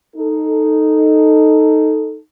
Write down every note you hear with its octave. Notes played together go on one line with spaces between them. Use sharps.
D#4 A4